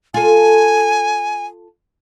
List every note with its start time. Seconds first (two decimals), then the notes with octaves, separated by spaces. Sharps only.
0.14 F4 A4 G#5